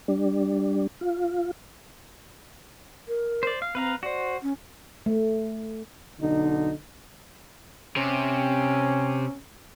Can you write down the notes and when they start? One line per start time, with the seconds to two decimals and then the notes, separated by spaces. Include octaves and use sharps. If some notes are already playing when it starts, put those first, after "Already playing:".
0.08 G3 D4
1.01 F4
3.08 A#4
3.43 C5 D5
3.62 F5
3.75 C4 B4 F5 A#5
4.03 F#4 C5 D5
4.42 C#4
5.06 A3
6.20 B1 D3 D#4
7.96 C3 C#4